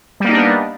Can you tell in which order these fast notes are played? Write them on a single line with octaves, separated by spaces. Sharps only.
G3 A#3 D#4 D4 B3